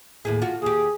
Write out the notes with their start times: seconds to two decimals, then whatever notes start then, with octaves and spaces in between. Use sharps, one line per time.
0.25 D#2 A2 G#4
0.42 F4 F#4
0.62 D#2 G4 G#4